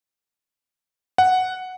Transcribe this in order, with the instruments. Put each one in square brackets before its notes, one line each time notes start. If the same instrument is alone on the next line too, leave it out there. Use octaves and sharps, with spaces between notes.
[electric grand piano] F#5